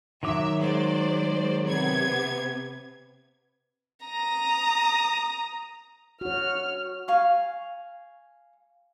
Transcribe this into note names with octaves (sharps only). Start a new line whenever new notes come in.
D#3 F#3 E5 D6
G#3 C5 D5
C3 B3 G#6
A#5 D#6
F#4 C#5 F6
F5 G#5 C#6